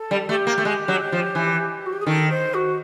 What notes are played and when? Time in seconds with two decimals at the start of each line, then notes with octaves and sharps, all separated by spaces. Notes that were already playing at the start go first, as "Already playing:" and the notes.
Already playing: A4
0.11 G3
0.29 A3 G4
0.47 A#3
0.58 A3
0.65 G#3
0.88 F#3
1.12 F3
1.35 E3
1.86 F#4
1.92 G4
2.00 G#4
2.06 D#3 A4
2.29 C5
2.54 F#4